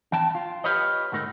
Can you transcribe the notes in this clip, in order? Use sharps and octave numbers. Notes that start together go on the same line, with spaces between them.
F2 E3 G5 A5
F4
F4 G4 B4 C#5 D#5
D2 G#2 A3 D#4 A#4